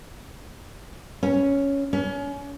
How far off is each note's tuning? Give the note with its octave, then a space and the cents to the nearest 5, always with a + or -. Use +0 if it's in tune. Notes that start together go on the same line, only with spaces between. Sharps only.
C#4 +5
C#4 +30